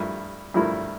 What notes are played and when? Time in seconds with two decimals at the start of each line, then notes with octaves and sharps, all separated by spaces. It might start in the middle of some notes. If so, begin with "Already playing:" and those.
Already playing: G2 F3 A3 E4 A#4
0.54 G2 F3 A3 E4 A#4